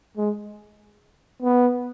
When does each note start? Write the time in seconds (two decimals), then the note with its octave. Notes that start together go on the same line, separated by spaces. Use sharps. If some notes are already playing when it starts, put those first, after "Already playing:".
0.17 G#3
1.42 B3